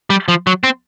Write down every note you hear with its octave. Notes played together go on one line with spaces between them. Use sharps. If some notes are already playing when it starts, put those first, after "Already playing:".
G3
F3
F#3
C4